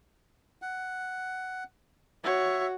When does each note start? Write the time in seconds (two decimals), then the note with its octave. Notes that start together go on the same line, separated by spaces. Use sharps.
0.62 F#5
2.24 F#4 C#5 E5